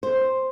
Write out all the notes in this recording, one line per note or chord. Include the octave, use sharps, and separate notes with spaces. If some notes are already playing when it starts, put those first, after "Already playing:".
C5